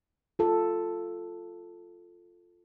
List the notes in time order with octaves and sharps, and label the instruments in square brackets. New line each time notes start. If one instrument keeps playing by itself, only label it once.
[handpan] F4 A4